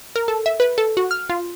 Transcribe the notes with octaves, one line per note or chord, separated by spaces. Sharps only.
A#4
A4
E5
B4
A4
F#4
F6
F4